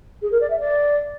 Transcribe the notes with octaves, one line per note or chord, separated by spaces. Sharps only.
G#4
A#4
D5
E5
D5